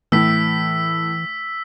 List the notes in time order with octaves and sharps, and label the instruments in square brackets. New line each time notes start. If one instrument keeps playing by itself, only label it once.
[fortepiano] A2 [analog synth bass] E3 [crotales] E6 B6